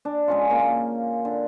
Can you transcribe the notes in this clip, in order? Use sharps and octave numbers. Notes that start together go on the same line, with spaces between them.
D4
G#3 C#4 F4
C#3 A#3 C#4
D3